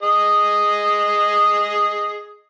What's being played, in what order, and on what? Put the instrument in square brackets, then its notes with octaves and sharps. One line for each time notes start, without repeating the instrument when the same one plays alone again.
[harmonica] G#4 D#5